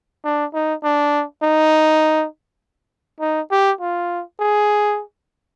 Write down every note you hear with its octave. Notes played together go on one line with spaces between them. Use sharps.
D4
D#4
D4
D#4
D#4
G4
F4
G#4